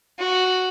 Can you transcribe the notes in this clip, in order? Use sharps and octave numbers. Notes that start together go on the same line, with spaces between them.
F#4